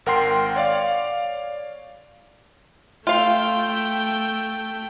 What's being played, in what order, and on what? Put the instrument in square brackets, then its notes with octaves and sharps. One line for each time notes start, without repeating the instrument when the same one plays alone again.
[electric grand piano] G#1 A#4 F#5 G5 C6 C7
C#5 D5 F5
[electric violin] A3 G5 [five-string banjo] F4 F5